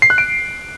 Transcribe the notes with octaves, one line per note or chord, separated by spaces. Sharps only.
C7
F#6
D7